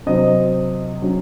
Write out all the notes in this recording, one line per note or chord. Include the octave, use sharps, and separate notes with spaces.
C3 F#3 C4 D#5
F#3 C#4